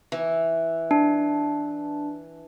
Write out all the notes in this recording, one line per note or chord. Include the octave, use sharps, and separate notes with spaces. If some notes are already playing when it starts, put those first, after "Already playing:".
E3
D4